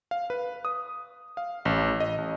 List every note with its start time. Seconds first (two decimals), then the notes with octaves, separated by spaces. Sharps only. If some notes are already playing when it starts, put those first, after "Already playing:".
0.11 F5
0.30 B4
0.65 D#6
1.37 F5
1.65 A1
2.00 D#5
2.18 A1